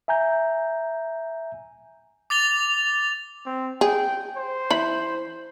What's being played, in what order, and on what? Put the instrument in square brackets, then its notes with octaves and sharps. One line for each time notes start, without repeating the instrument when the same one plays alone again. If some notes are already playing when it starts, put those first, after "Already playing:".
[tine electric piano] E5 G#5 A#5 G6
[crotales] D6 A6 F7 G7
[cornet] C4
[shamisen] G#4 [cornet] G5
[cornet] C5
[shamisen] E3 B5